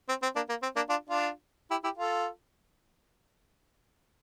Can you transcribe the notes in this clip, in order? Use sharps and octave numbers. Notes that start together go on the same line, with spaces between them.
C4
C4
A#3 D4
A#3
C4
A#3 D4
D4 F4
D4 F4
E4 G4
E4 G4
F4 A4